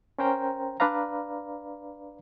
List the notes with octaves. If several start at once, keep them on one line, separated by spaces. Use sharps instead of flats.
C#4 A#4 C5 G5 A#5
D4 B4 D5 F5 A#5